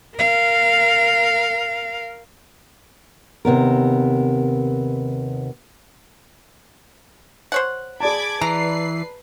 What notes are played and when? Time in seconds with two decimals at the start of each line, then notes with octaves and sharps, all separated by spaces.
0.17 A#4 F5
3.45 D#2 C3 B3 A#4
7.52 C5 C#5 F#5
8.00 G#4 D5 A5 B5 D6 G#6
8.41 E3 B4 A#5 C7